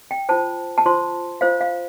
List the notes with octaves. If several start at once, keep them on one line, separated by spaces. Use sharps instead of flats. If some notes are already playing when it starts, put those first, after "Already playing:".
G5
F4 C5 A5
A5
F4 C5 C6
F4 C5 F5
F5